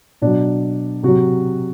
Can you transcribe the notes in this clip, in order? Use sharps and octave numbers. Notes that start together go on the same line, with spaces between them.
B2 F#3 D4
C3 F#3 F#4